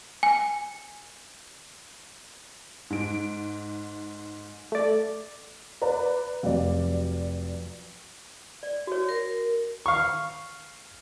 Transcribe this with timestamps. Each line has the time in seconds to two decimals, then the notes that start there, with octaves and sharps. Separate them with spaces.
0.23 G#5
2.90 G#2 D7
4.72 A3 D5
5.82 B4 D5 A#5
6.43 F1 F#3 D5
8.63 D5
8.87 F#4 C#5
9.09 A#4
9.86 F5 C#6